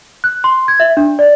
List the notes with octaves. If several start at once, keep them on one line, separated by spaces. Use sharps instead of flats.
F#6
C6
G#6
E5
D4
D5